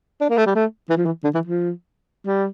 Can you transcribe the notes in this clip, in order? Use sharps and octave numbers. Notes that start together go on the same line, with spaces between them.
D4
A#3
A3
G3
A3
E3
F3
E3
D3
E3
F3
G3